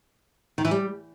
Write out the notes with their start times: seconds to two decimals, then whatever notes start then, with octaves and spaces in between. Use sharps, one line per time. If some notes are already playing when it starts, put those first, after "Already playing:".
0.58 D#3
0.65 E3
0.71 G3